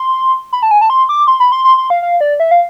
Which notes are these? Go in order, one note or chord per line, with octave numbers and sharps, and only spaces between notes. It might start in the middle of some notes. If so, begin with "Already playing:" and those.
Already playing: C6
B5
A5
G#5
A5
C6
D6
C6
B5
C6
C6
C6
F5
F5
D5
E5
F5